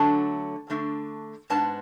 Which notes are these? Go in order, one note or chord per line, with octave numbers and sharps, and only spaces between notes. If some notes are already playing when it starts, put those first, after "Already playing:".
Already playing: D3 F#3 A3 D4 A5
D3 A3 D4
G#2 G#3 B3 D4 A5